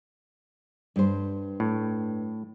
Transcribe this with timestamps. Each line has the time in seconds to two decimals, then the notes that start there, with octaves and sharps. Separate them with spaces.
0.96 G2 C5
1.60 A2